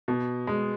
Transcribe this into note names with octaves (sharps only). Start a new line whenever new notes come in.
B2
G#3